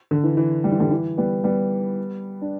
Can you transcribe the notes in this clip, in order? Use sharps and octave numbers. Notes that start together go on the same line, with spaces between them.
D3
E3
E3
G3
E3
D3 G3
E3
G3 B3
G3 B3
D4